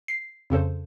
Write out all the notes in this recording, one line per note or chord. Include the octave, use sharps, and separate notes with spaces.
C7
F2 C#3 A4 C5